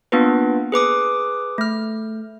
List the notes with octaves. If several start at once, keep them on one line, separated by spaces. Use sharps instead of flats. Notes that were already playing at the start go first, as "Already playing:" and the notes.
A#3 B3 D4 F4 B4
G#4 B4 D6 D#6
A3 F6